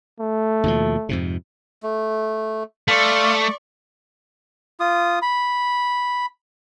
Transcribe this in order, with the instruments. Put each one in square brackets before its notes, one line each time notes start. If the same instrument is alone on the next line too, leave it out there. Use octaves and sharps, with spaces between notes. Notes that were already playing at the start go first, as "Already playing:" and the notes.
[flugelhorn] A3
[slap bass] D#2 B2 F3
F2 G#2 C3
[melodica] A3
[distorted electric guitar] A3 [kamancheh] D5 C#6 [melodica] F5 C6
[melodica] F4 D#6
B5